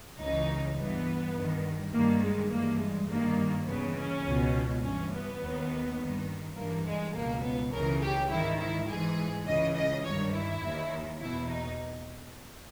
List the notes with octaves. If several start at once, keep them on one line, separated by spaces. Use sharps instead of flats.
C#2 C#3 E3 D#4
G2 E3 B3
G2 D#3
G2 D#3 A#3
G#3
G2 E3 A#3
G#3
G2 D#3 A#3
D#2 C#3 E3 B3
C#4
C#2 B2
G2 E3 C#4
B3
D#2 D#3
G2 D#3
G2 E3 A#3
G#3
C#2 B2 A#3
B3
C#2 C#3 E3 A#4
G4
G#2 D#3 E4
E4
G#2 E3 G#4
C#2 C#3 E3 D#5
D#5
G2 D#3 C#5
E4
D#2 D#3
E2 B2 E4
D#4